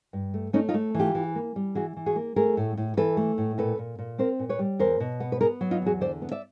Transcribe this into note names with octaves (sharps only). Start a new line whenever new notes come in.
G2
A3
A3 C#4 D#4
D#4 F4
A3
E3
F4 G4
E3
A#3
G3
E3 F#4 G#4
E3
F#4 G#4
A#3
A3 G#4 A#4
A2
A2
E3 A4 B4
A3
A2
A#2 A4 B4
A#2
A#2
C4 A#4 C5
A#2
B4 C#5
G3
E2 A#4 C5
B2
B3
B4
B3 G#4 A#4
F#3
D#4 F4
E2 F#4 G#4
D3 C5 D5
B3
D5 E5